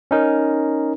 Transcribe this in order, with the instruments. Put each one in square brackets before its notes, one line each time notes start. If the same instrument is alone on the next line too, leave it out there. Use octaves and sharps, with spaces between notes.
[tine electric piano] C#4 D#4 A#4